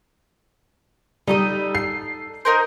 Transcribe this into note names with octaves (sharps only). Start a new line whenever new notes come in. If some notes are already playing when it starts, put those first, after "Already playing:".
G3 D#4 A4 D#6
C7
D#4 A#4 C5